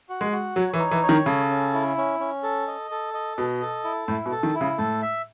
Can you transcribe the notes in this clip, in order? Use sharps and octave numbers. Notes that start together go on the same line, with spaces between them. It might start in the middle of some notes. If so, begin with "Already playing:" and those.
F#4
G#3
F#4
F#3 C#5
E3
D#4
E3
C#5
D#3
C#3 A4
C#4
E4
C#4
C#4
A4
D#5
A4
D#5
B2 D#5
A4
E4
A2 E4
B2
A4
D#3
E4
C#3
A2 A4
E5